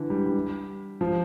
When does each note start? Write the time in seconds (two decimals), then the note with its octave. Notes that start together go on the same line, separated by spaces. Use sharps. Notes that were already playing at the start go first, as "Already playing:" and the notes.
Already playing: D3 E3
0.10 G3
0.26 G3
1.01 F3